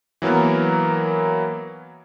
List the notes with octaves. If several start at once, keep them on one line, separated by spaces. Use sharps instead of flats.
E3 F#3 A#3 B3 A#4